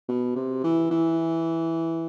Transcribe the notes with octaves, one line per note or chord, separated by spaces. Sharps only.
B2
C3
E3
E3